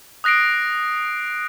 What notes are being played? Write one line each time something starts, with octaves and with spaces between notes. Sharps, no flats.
D#6 F#6 A#6 C7 D7